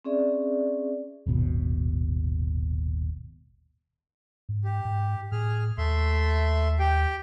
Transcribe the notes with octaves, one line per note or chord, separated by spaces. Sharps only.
C4 C#4 G#4 D5 E5
D#1 G#1 B2
G#2
G4
G#2
A2 G#4 F6
D#2 A3 E5 C6
G4 G5